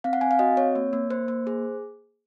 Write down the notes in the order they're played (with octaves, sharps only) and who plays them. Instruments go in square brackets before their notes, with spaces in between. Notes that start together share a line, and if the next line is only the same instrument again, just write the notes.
[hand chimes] C4 F5
F#5
C4 G#5
F5
F#4 D#5
C4 C#5
A#3
A#3
A#3 C5
A#3
G#4